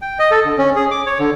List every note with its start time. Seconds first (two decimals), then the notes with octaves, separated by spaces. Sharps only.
0.02 G5
0.19 D#5
0.31 A4
0.45 D3
0.58 C#4
0.76 G#4
0.91 D6
1.06 C#5
1.19 D3